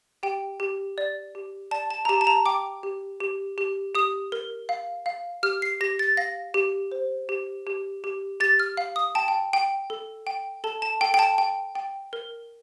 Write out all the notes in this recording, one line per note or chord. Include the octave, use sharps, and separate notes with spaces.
G4 G5
G4
D5
G4
D5 A5
A5
A#5
G4 A5
A5
A#5
G5 D6
G4
G4
G4
G4 D#6
A#4
F5
F5
G4 F6
C7
G4 A#6
A6
F5 A#6
G4
C5
G4
G4
G4
G4 A6
F6
F5
D#6
G5 A5
G5
G5
A4
G5
A4 A5
A5
A4 G5
G5
A5
G5
G5
A#4